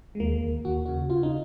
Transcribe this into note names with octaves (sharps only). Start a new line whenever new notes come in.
G#3
D#2 A#3
D#2
D#2 F#4
C#3 F#4
C#3 F4
D#4